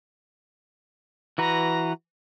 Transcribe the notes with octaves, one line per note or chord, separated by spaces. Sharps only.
E3 F#4 B4 A#5